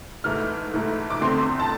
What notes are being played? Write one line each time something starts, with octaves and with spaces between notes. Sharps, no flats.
G#2 E3 A3 E4 F6
G#2 E3 A3 E4
D6
E2 D3 A3 C4 C6
A5